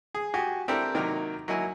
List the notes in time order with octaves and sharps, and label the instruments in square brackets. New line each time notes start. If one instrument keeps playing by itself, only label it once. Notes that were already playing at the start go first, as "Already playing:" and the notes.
[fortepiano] G#4
F#4 G4 G#5
C4 D4 E4 G4 A4 A#4
C3 D#3 F#3 A#3 D#4 A#4
F#3 A#3 D#4 E4 G#5